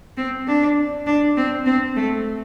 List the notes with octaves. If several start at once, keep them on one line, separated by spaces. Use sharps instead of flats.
C4
D4
D4
C4
C4
A3